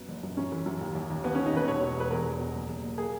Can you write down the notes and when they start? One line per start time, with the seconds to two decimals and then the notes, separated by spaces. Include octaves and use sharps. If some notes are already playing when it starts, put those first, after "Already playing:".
Already playing: F#2 B3
0.08 F#1
0.23 F#2
0.37 F#2 C#4
0.52 E3
0.66 F#2
0.81 D#2
0.95 D#2
1.10 D#2
1.24 D#2 B3
1.35 D#3 C#4
1.46 D#4
1.53 D#2 B4
1.68 E1 C#5
1.82 B2
1.97 E1 B4
2.11 E2 A#4
2.26 E2
2.40 B2
2.54 F#1
2.69 F#1
2.84 F#1
2.98 A#3 G#4